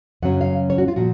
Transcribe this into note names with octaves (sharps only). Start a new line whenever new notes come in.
F#2 C#3 F#3 C#4 F#5
F5
C#5
F#4
F4
A#2 F3 F#4